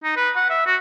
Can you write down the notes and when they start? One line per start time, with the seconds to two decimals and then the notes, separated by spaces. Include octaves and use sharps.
0.03 D#4
0.16 B4
0.36 F#5
0.50 E5
0.66 F#4